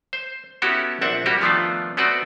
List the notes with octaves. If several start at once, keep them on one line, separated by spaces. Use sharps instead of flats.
C5
B3 C#4 E4 F#4 G4 A4
A#1 C4 D4 E5 F#5
G3 A#3 F#4 G4
D#3 F3 A3 B3 D4 F4
A3 B3 C4 F#4 B4 D5